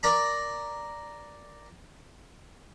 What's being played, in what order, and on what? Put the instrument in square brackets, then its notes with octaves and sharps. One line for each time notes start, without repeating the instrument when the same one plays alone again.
[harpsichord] A#4 D5 A#5 B5